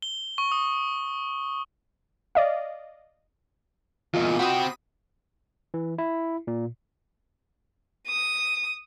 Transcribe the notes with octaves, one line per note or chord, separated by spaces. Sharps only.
G7
C#6
D#6
D5 D#5 F5
E2 A#2 F4 D#5
C4 F#4 G4 B5 D#6
E3
E4
A#2
D#6